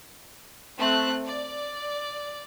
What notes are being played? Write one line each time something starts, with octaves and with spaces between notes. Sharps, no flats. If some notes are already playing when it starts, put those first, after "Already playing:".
A3 C4 F#6
D5